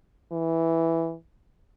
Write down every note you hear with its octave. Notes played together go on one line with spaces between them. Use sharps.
E3